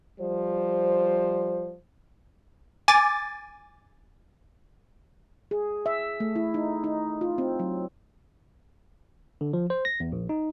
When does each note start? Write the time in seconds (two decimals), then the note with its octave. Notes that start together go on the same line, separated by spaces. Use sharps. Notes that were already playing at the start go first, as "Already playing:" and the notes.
0.20 F3 G3 C5
2.88 G#5 D6 A6
5.51 G#4
5.86 E5
6.20 A3
6.36 E4
6.54 D#4
6.84 D#4
7.21 F4
7.38 C4
7.59 F#3
9.41 D3
9.53 F3
9.70 C5
9.85 A#6
10.00 E2
10.12 A#1
10.29 D#4